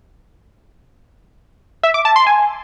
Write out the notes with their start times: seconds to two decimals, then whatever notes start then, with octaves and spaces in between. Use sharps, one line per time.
1.83 E5
1.94 D6
2.05 A5
2.16 C6
2.27 G#5